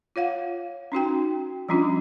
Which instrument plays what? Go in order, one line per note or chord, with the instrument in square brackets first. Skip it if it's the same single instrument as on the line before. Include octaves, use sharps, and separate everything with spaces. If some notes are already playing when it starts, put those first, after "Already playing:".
[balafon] F4 C#5 F5 F#5
C#4 D#4 F#4 G5
F3 G3 C#4 D4 F4